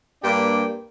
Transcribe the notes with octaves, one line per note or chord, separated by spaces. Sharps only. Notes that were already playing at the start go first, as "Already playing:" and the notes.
G2 A#3 D4 G4 D5 G5